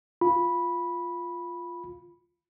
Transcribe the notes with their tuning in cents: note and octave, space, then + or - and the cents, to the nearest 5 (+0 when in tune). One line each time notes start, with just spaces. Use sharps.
F4 +0 B5 -10